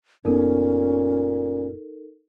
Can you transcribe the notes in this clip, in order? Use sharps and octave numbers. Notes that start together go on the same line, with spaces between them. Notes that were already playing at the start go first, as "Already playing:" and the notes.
F#1 A#2 B3 C#4 D#4 A4 A#4